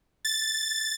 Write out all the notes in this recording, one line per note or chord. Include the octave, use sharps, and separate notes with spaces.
A6